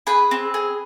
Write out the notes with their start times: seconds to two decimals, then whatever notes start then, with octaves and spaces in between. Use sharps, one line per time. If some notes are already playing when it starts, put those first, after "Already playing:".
0.07 G#4 B4 B5
0.31 C4
0.54 G#4